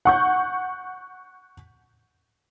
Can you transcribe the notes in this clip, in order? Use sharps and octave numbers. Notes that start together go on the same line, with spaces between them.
F#5 C#6 G6